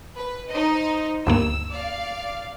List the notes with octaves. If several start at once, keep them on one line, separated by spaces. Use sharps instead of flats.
B4
D#4 C5 D#5
D2 G2 A#3 E6
D5 F5